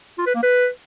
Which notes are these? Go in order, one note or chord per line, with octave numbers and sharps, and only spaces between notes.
F4
B4
A#3
B4